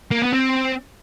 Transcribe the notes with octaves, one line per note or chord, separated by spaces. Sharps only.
A#3
B3
C4